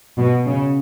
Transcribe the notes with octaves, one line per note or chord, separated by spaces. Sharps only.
B2
C#3